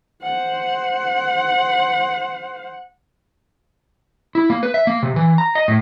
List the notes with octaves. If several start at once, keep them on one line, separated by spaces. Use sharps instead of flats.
C5 F#5
E4
A#3
B4
E5
A#3
C3
E3
A#5
D#5
A2